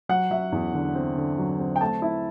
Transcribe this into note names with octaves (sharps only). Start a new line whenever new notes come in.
F#3 F#5
F#3 E5
E2
D3
C4
D3
F#3
C4
G5
A3 A5
E4